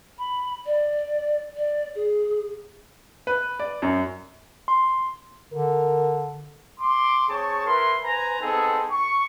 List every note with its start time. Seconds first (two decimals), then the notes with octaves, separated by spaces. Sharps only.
0.19 B5
0.66 D5
1.56 D5
1.95 G#4
3.27 B4
3.59 D5
3.82 F#2
4.68 C6
5.53 D3 A#4
6.80 C6 D6
7.29 C4 G#4 C#5 A5 C#6
7.66 E4 A#4 B4 C6
8.01 B4 C5 G#5 A#5
8.40 B3 C4 D#4 G#4 A4
8.91 C#6